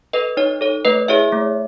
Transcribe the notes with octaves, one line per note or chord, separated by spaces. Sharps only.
A4 B4 D#5
D#4 C#5
A4 C#5
A3 B4 D#5
E4 G#4 C#5 E5
A3